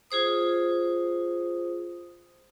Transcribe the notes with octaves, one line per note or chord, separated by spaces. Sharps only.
F4 G#4 C5 D#6